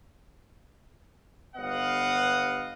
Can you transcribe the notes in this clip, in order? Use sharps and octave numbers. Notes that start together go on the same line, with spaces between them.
G1 B3 D#5 F5 F#5